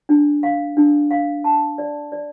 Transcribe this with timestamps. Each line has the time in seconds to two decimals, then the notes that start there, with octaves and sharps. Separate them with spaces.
0.09 D4
0.43 F5
0.77 D4
1.11 F5
1.44 A5
1.78 D5
2.12 D5